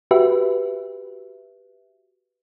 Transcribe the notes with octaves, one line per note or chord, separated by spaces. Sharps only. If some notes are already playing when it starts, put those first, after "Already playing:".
F#4 G4 B4 E5